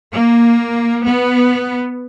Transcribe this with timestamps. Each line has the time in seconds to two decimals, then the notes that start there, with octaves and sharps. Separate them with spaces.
0.13 A#3
1.05 B3